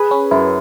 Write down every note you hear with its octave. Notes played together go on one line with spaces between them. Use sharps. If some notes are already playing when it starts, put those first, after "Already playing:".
Already playing: G#4 B4
C#4
F#2 E4